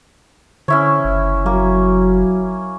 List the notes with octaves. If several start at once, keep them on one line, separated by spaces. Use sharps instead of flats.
D3 C#4 E4 C#5
F#1
F#3 A#3